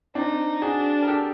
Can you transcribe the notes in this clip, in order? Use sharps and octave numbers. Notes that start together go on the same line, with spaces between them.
C4 D4 D#4
D4 F#4 G#4
A#4
G4 A4